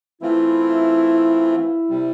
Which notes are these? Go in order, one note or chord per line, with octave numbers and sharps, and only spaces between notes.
E3 A3 C4 E4 F4
E4
C3 G3